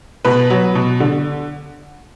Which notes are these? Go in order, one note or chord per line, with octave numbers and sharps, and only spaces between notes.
B2 B4
F#3
B2
D3